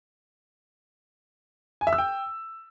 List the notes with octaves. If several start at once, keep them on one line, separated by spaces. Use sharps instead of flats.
G#5
E5
E6
G5